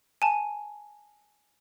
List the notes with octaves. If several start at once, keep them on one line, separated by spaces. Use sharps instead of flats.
G#5 A5